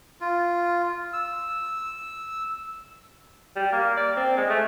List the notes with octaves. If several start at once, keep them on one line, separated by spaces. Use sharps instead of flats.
F4
E6
G3
A#3
D5
C4
G#3
A3